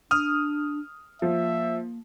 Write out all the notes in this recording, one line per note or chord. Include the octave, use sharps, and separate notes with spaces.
D4 D#6 F6
F3 A#3 E5